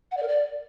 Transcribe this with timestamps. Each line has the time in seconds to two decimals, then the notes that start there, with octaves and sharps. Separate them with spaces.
0.11 F#5
0.17 D5
0.23 A#4
0.28 D5